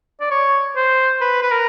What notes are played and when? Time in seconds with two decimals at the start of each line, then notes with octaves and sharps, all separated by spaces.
0.20 D5
0.31 C#5
0.76 C5
1.21 B4
1.43 B4
1.51 A#4